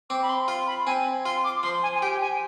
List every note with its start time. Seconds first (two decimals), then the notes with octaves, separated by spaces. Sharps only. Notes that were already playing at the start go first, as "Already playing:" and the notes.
0.10 C4 D6
0.22 B5
0.29 C6
0.48 F4 C6
0.67 B5
0.86 C4 G#5
1.25 F4 C6
1.44 D6
1.63 F3 C6
1.83 G#5
1.95 G#5
2.01 G4 G5
2.21 G#5